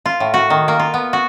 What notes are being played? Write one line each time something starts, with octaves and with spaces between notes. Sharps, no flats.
F4
A2
F#4
D#3
A#3
F4
B3
F#4